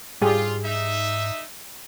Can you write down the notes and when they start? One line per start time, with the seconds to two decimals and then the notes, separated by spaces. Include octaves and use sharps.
0.22 G#2 G3 F4 G4 G#4
0.63 D#4 E5